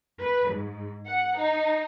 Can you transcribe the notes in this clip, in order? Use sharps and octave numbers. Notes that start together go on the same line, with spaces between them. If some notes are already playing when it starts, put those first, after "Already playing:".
B4
G#2
F#5
D#4